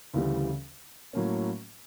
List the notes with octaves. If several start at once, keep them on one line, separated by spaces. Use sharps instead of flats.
D2 C#3 E3 G3
A2 F#3 A#3 C#4